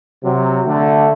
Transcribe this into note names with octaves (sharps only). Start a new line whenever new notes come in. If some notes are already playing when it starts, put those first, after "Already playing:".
C3 F#3
D3 A3